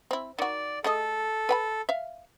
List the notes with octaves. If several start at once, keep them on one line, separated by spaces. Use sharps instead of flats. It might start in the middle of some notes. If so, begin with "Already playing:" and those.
C4 E4
D#3 F#4 D5
A3 G#4 A4 D#5
B4 G5 B5
E5 F5